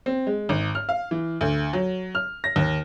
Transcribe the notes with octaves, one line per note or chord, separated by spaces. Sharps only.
C4
G#3
G#1
F6
F5
E3
D2
F#3
F6
A#6
D#2